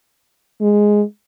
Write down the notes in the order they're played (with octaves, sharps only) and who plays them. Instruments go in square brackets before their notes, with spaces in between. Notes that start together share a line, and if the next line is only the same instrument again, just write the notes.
[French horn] G#3